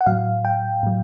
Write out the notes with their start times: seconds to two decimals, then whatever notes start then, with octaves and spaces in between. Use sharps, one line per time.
0.01 F#5
0.06 A2 F#3 F5
0.45 G5
0.83 A2 F#3